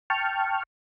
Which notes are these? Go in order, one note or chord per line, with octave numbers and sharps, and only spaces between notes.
G5 A5 C#6 F6